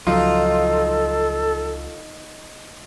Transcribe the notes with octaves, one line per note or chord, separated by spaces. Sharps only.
C#2 F3 F#3 D#4 F4 A4